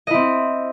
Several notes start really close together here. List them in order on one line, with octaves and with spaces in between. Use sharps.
D#5 E4 C4